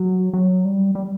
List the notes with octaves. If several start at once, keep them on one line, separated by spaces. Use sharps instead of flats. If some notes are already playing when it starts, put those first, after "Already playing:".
Already playing: F#3
F#3
G3
G3